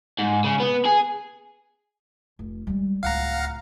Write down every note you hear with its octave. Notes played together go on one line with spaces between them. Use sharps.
G#2
C#3
B3
G#4
F1
G3 G#3
D1 C#2 F5 F#5 A#5